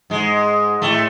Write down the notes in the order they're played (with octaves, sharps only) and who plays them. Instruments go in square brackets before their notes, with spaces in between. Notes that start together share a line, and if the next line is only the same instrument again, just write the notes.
[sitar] G#2 G#3
A2 A3